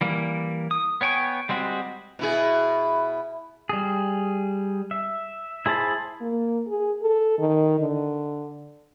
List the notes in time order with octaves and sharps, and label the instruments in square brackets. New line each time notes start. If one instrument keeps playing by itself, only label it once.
[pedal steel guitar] E3 G3 A#3
D#6
B3 C#5 G5 G#5 C#6
G3 G#3 C4 F#4 G4
[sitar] B2 E4 G#4
[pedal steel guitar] G3 G#4
E5
E4 G#4 C5 A5 B5
[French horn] A#3
G#4
A4
D#3
D3